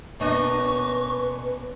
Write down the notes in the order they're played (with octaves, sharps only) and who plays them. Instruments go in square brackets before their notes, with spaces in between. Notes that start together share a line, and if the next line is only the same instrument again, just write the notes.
[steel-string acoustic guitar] B2 A#3 [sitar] C#4 D4 D#5 [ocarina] B4 [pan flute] C#6